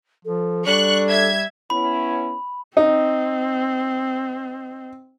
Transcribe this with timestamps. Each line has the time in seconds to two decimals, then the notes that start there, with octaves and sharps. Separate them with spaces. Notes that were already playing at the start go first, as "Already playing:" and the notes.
0.25 F3 A4
0.67 G3 D4 A4 C#6 F#6
1.08 E5 G#6
1.70 B3 C#4 E4 B5
2.77 C4 D#4